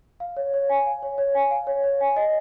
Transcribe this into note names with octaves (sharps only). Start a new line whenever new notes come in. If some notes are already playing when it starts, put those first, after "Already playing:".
F5
C#5
C#5
G#5
F5
C#5
C#5
G#5
F5
C#5
C#5
G#5
D#5